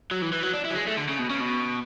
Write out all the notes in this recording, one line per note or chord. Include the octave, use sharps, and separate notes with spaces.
F#3
E3
E3
F#3
D4
E4
F#3
G#3
A3
D3
C#3
B2
C#3
B2